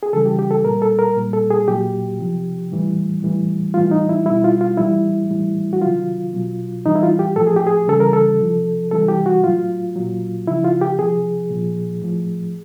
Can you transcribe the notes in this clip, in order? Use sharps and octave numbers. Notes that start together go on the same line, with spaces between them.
G#4
C#3 E3 G3 A4
G4
G4
A4
A#2 G3 A#4
A4
A#4
A#2 G3
A4
G#4
A#2 F#3 G4
C3 F3
A2 E3 G3
A2 E3 G3
A2 E3 G3 F4
D#4
E4
B2 G3 E4
F4
F4
A2 E3 G3 E4
A2 E3 G3
F#4
C3 D#3 F#3 F4
B2 F#3
A2 E3 G3 D#4
E4
F4
G4
A2 F3 A4
G#4
G4
G#4
C#3 E3 G3 A4
A#4
A4
C3 F3
C3 E3 G3 A4
G4
F#4
A2 F#3 F4
A#2 F#3
C#3 F3 E4
F4
G4
C3 F3 G#4
A#2 F3
A2 F3